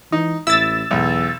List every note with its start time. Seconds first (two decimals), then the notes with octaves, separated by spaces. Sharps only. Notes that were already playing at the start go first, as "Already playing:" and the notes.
0.12 E3 D#4
0.47 A1 E4 E6 A6
0.91 B1 E2